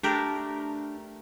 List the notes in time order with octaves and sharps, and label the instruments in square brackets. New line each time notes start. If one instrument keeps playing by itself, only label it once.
[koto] A3 G4 A#4 [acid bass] D4